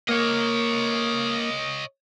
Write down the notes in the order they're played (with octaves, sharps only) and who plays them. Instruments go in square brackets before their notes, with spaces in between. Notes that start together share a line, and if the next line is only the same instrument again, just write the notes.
[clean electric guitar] A#3 [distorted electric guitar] C#5 D#5